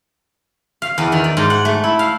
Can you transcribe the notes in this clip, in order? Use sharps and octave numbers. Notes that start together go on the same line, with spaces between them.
F5
E2
D#3
D5
G#2
F#5
A3
E4
F5